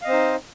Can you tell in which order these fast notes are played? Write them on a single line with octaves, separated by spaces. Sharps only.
F5 D#5 C4 C5 D#4